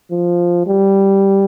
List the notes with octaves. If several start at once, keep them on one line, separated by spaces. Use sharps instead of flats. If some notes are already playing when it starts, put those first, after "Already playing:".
F3
G3